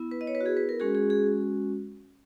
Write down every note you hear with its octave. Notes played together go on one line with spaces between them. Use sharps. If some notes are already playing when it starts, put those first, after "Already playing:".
Already playing: B3 E4
B4
D#5
C#5
B4
F#4
G#4
B4
A#4
G#3 C#4 F#4 G#4
G#4
G#4